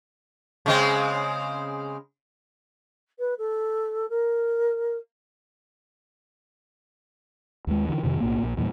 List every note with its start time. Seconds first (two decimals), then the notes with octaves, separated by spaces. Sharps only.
0.66 C#3 G#3 C4
3.19 B4
3.38 A4
4.10 A#4
7.67 D#2 G#3
7.89 D3 E3
8.04 F2 C3 D#3
8.20 B1 A2 A#3
8.43 A#1 A#2
8.57 E2 A#2 F3 G3